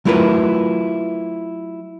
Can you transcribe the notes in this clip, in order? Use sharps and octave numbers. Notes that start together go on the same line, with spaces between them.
F#3 A3 E4 F4 A#4 B4